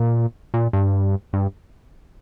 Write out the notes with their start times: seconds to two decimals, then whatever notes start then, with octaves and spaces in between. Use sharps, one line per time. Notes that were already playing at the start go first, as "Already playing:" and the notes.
Already playing: A#2
0.54 A#2
0.73 G2
1.33 G2